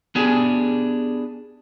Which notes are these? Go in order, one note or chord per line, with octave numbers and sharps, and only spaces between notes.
B3 D4 G4 G#4